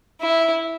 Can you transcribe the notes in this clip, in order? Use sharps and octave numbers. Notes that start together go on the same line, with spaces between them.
E4